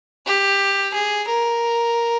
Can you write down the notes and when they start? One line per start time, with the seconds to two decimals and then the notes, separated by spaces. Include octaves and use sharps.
0.26 G4
0.94 G#4
1.28 A#4